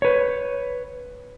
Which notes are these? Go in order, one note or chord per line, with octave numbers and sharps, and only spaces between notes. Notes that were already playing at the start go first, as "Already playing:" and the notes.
B4 C#5